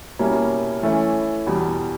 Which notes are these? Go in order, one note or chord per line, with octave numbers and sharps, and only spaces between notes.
B2 G3 A#3 C#4 E4
E3 A3 C#4 E4
E2 B2 G3